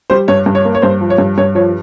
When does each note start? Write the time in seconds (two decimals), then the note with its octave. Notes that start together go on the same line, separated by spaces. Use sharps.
0.10 G3 C5
0.28 G2 C#5
0.46 G2
0.55 C#5
0.65 A#3
0.75 C#5
0.82 G2 C5
1.01 F3
1.10 C#5
1.18 G2
1.38 G2 C#5
1.55 F3 C#5